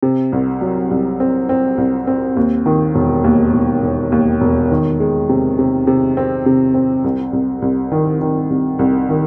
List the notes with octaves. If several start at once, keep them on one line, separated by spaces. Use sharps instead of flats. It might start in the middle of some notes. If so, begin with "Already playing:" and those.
C3
C2
F#3
C2
C4
C4
C2
C4
D#2
D#3
E1
D#2
E1
E1
D#2
E1
D#3
G#3
C3
C3
C3
C4
C3
C4
C2
C2
C2
D#3
D#3
C2
C2
D#3